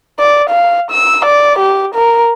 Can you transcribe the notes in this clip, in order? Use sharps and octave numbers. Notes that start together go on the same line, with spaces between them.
D5
F5
E6
D5
G4
A#4